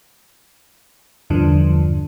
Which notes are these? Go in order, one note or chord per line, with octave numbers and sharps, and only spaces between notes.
E2 G2 D3 F3